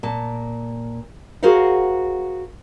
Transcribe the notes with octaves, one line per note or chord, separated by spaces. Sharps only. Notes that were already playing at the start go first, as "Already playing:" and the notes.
A#2 A5
F#4 G#4 A#4 C5 F5 F#5